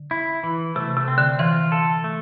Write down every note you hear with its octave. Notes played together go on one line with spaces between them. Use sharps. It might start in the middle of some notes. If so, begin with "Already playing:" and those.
Already playing: D3
E4
E3
C3 A3
C3
C4
D3
E3 F4
A4
A3